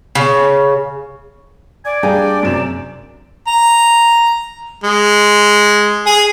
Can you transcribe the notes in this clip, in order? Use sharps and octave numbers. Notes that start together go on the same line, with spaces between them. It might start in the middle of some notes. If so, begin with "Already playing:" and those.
C#3
D5 G#5
G3 D4 G#4 F5 G5 G#5 A#5
F#2 C3 E7
A#5
G#3
G#4